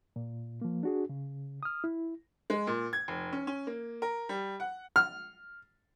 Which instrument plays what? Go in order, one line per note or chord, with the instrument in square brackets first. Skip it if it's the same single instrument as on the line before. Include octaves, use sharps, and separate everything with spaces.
[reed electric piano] A#2
F3 A#3
D4 F#4 G#4
C#3
D#6 F6
E4
[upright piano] G#3
A#2
G#6
F1
C#4
C#4
A#3
A#4
G3
F#5
[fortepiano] F6